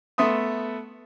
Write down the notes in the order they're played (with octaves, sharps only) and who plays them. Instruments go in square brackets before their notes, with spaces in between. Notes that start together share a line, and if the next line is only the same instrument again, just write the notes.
[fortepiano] A3 B3 E5 C6 D#6